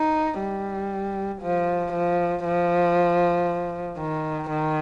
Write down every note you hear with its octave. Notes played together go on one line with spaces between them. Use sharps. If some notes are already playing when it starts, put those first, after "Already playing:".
Already playing: D#4
G3
F3
F3
F3
D#3
D#3